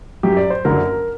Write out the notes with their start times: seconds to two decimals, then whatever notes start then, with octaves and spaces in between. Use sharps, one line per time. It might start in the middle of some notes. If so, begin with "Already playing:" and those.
0.23 F#2 F#3 G4
0.37 D5
0.50 C5
0.65 F#1 F#2 D3 F#3 A#4